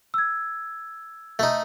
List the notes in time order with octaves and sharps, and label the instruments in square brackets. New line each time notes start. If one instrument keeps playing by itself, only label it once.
[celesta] E6 G#6
[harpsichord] A3 D#4